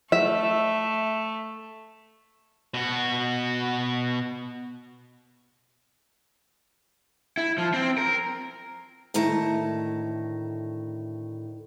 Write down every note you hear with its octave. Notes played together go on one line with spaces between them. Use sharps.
A3 E5
B2 F#4
E4
F3
C4
A#4
D2 A2 D#3 A5 A#5